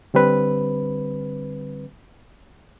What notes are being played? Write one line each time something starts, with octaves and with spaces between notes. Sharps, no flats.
D3 G3 C4 B4